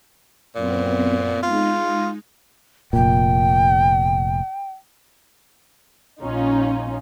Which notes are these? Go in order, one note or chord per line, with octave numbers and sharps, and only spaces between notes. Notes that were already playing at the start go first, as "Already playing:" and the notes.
F#2 A#2 B3 C4
G#3 D#4 F4
F1 A#2 G5
A#1 C#4 D#4 F4